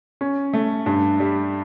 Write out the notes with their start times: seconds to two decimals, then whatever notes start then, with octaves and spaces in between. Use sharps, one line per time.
0.21 C#4
0.53 A3
0.86 G2
1.20 G3